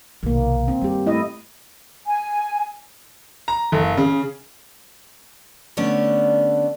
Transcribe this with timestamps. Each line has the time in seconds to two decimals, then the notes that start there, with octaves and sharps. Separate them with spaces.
0.23 B1 C3 D#3 A#3
0.68 C4
0.82 G2 G3 G4
1.06 A3 E4 D#5
2.06 G#5
3.48 A#5
3.72 F#1
3.97 C#3
5.77 D3 A3 B3 C#4 D4 C#5